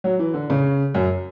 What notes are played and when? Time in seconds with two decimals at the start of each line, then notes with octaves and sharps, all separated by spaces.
0.04 F#3
0.19 E3
0.34 D3
0.50 C#3
0.94 F#2